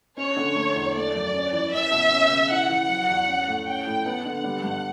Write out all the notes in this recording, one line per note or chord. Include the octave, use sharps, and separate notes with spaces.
C#4 C#5
D3
A3
E2
A3 D5
F#2
C#4
E3
C#4 E5
B2
C#4
C#3
E4 F#5
E3
F#3
E2
C#4
A2
C#4 G5
A2
B3 F#5
D3
G3
G2